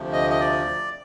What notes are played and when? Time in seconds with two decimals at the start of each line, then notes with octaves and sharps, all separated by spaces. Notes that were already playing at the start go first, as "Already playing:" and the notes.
Already playing: D2 C3 F3
0.13 D#5
0.30 D#5
0.40 D5